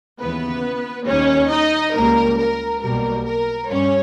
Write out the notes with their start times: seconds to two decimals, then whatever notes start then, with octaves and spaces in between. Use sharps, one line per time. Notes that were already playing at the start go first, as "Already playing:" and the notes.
0.20 D#2 C#3 E3 B3 B4
1.07 D#2 D#3 G3 C#4 C#5
1.51 D#4 D#5
1.96 C#2 C#3 G3 A#3 A#4
2.39 A#4
2.82 B1 B2 G3 A#3 A#4
3.26 A#4
3.70 G2 G3 C#4 C#5